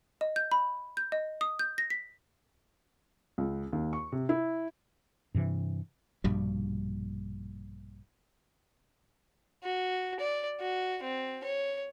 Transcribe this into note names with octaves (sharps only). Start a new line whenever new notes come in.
D#5
G6
B5
G6
D#5
D#6
G6
A#6
B6
C#2
D#2
C#6
C3
E4
G2 C3 E3
A#1 G2 B2 G3
F#4
D5
F#4
C4
C#5